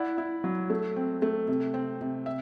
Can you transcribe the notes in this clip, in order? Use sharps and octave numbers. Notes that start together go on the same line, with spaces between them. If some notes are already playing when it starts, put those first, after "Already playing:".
Already playing: E4 D5 F#5
E4
F#3
A3
C4
A3
C3
C4
C3
E5